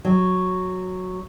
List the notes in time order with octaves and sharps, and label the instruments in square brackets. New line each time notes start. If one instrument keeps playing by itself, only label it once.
[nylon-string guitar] F#3